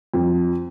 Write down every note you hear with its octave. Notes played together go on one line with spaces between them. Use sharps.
F2